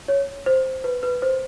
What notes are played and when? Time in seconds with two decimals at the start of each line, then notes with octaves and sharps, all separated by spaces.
0.08 C#5
0.46 C5
0.84 B4
1.03 B4
1.22 C5